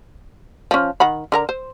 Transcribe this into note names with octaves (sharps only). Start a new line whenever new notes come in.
F3 C#4
D#3 F#5 B5
D3 A#4 A#5
C5